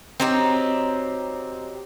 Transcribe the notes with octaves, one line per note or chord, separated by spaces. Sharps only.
F#3 C4 D#4 G4